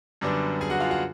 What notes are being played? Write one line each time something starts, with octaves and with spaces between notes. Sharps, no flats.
F#2 D3 G3 B3 D4
G#4 G#5
F#4 F#5
F4 F5
F#4 F#5